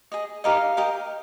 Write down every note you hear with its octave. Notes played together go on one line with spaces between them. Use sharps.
G#4 D#5
D#4 G4 A#4 D#5 F5
G4 A#4 D#5